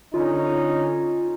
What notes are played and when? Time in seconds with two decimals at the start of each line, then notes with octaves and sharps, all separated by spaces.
0.14 D3 C#4 D#4 F4